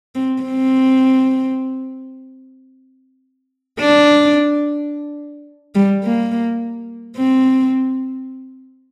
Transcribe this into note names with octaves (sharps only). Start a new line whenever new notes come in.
C4
C4
D4
G3
A#3
C4